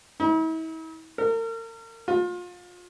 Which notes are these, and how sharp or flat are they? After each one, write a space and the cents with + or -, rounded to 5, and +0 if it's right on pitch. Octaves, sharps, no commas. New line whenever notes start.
E4 -45
A#4 -40
F4 +30